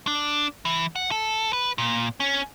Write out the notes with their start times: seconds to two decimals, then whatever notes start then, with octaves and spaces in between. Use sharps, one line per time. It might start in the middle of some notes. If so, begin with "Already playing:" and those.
0.07 D4
0.65 E3
0.96 F#5
1.11 A4
1.53 B4
1.78 A#2
2.20 C#4